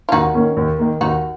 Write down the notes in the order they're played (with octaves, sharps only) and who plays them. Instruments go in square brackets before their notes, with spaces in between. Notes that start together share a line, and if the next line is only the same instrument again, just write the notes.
[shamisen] F4
[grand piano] D#2 [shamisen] D#4 F#4
[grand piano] D#3 A#3 C#4
D#2
D#3 A#3
[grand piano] D#2 [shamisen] D#4 F#4